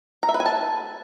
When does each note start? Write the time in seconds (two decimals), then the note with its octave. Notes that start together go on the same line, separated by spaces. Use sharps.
0.23 A#5
0.29 E5
0.34 B4
0.40 G#5
0.46 A5